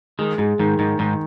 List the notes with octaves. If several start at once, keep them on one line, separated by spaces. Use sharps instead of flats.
D#3 G#3
G#2 G#3
G#2 D#3
G#2 D#3
G#2 D#3